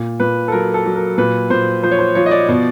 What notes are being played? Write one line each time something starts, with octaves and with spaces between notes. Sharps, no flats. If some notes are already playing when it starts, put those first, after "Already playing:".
Already playing: A#2
A#2 B4
A4
F#3 A#4
A4
F#3
A#4
A#2 B4
A#2 C5
F3 C5
C#5
C5
F3 C#5
D#5
D5
B2